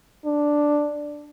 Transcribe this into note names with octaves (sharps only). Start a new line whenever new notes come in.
D4